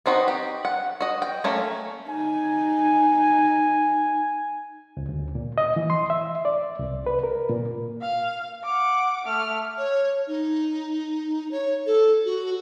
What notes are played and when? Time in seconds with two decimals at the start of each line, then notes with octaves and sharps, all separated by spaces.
0.06 B3 C4 D#4 F#4
0.28 G4
0.65 F#5
1.01 F#4 D#5
1.22 G5
1.44 A3 A#3 C#4
2.09 D#4 G#5
4.97 C#2
5.09 D2
5.35 A#2
5.58 D#5
5.76 E3
5.90 C6
6.10 E5
6.45 D5
6.79 C2
7.06 B4
7.23 A#4
7.50 A#2
8.01 F5
8.64 F#5 D6
9.25 A3 F6
9.78 C#5
10.28 D#4
11.51 C#5
11.86 A4
12.25 F#4